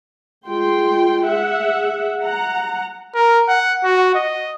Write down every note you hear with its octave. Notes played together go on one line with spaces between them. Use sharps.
G#3 F4 G5 C6
G#4 E5 F#5
F#5 A#5
A#4
F#5
F#4
D#5